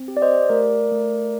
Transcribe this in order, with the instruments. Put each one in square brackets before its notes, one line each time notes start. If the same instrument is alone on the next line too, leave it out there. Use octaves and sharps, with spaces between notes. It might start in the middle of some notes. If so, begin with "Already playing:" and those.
Already playing: [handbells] C4
G4
D5
C5 D#5
A3 A#4 D5
A3